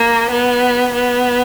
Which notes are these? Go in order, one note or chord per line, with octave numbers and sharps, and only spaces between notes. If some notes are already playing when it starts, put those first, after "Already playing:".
Already playing: A#3
B3
B3